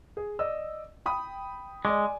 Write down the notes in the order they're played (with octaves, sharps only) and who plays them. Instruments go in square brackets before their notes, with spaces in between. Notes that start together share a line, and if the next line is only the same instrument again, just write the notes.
[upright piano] G#4
D5 D#5 E6
G5 B5 D#6
[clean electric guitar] G#3 [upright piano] D5 G#5 D6